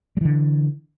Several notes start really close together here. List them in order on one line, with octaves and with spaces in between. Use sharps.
G3 E3 D3